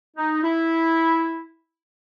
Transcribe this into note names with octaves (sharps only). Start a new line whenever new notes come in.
D#4
E4